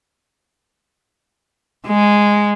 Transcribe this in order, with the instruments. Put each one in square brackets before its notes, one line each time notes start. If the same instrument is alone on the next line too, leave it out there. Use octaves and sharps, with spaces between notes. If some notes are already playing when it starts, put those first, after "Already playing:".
[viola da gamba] G#3